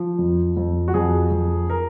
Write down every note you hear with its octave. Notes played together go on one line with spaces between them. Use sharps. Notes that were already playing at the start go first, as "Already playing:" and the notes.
Already playing: F3
F2
F2
F#4
F2 G#4
F2
A#4